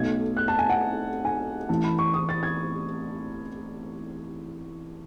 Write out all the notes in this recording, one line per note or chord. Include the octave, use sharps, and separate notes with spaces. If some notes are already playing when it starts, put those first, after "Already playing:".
Already playing: B1 B2 A3 G#6
F#6
A5
G#5
F#5
G#5
A1 A2 E3 A5
B5
C#6
D#6
A6
G#6